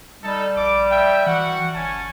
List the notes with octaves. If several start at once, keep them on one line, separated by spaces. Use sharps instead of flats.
G3 D#4 A4
A#1 D6
E5 G5
E3 F#4 F#5
G1 C#4 G#5 A5